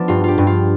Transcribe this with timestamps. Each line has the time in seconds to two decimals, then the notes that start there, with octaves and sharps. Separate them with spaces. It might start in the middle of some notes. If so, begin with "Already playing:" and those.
Already playing: F3 B3 D4
0.08 G2 F4
0.24 F4 G4
0.38 G2
0.47 F4